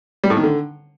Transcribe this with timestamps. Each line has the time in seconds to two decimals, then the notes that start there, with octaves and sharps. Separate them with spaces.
0.24 G3
0.30 A2
0.37 D#3
0.43 D3